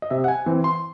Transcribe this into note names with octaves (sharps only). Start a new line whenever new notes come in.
D#5
C3 E5
F#5
G#5
E3 C4
C6